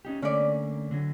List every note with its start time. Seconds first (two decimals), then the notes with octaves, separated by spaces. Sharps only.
0.05 C#4 D#4 G4
0.22 D3 A3 A#3 C#4 D5
0.91 D3 F#3